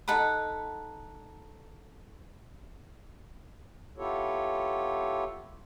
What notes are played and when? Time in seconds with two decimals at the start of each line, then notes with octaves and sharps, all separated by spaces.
0.08 D#4 A4 F#5 B5
3.97 B3 E4 F4 G4 A4 C#5